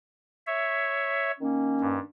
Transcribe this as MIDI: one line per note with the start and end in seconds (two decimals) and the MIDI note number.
0.47 1.32 73
0.47 1.32 76
1.40 2.00 51
1.40 2.00 58
1.40 2.00 61
1.81 1.99 43